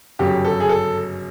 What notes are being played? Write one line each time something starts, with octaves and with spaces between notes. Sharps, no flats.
G1 F#2 C#3 F#3 G4
A4
G#4
A4